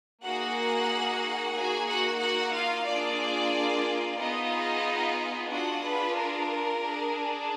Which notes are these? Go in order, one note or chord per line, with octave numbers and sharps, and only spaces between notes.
A#3 D#4 F#4 G#4 F#5
A#3 D#4 F#4 G#4 G#5
F#4 F#5
F#4 F#5
F4 F5
A#3 D4 F4 G#4 D5
B3 D#4 F4 G#4 D#5
D4 F4 F#4 G#4 F#5
B4
A#4
D4 G#4